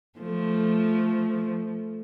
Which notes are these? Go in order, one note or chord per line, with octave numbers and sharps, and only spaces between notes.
F3 A3